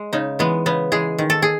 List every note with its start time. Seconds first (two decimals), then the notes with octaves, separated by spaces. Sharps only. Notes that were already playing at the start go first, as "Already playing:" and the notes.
Already playing: G#3
0.13 C#3 D#4
0.39 E3 G#3 B3
0.66 C#3 B3
0.92 E3 G#3 G#4
1.18 D#3
1.30 A4
1.42 G#4